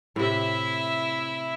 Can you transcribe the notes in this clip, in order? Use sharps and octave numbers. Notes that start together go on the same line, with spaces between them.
A2 C3 E4 E5